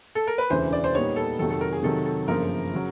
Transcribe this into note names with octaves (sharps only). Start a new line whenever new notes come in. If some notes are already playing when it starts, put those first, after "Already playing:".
A4
A#4
B4
E1 D2 C#3 E3 C5
D5
C5
A#2 G3 B3 D#4 C#5
A4
F2 C3 D#3 F#3 A4
A4
A#4
G#4
C3 D#3 F#3 A4
A4
G1 F#2 C#3 F3 A#3 A#4
C#3 F#3